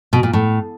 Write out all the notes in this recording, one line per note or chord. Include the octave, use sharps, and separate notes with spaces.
B2
A#2
A2